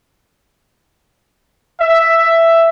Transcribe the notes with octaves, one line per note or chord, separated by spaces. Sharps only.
E5